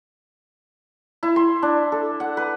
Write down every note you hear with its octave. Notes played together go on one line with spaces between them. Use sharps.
E4
C6
D4
A4
F#5
B4